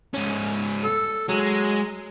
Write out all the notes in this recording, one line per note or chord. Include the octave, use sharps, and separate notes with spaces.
G#2 C#4
A4
F#3 G#3